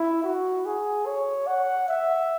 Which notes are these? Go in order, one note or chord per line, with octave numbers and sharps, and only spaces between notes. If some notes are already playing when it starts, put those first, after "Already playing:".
Already playing: E4
F#4
G#4
C#5
F#5
E5